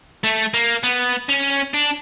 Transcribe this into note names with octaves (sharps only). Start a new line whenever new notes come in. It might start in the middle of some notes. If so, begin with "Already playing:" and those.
A3
A#3
B3
C#4
D4